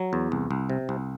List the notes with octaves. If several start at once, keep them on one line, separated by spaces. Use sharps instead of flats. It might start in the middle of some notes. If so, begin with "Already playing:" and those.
Already playing: F#3
E2
C2
C2
C3
C2